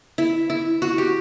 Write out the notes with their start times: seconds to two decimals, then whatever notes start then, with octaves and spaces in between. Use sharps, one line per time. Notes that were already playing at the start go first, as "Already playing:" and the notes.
0.18 E4
0.50 E4
0.82 F#4
0.98 G4